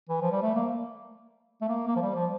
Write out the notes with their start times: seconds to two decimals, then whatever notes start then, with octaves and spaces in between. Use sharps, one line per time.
0.09 E3
0.21 F3
0.32 G3
0.42 A3
0.55 A#3
1.61 A3
1.69 A#3
1.88 A#3
1.96 F3
2.02 G3
2.15 F3